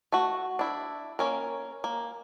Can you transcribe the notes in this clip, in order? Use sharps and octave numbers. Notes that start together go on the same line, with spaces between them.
A3 F#4
D4 E4
A#3 C#4 A#4
A#3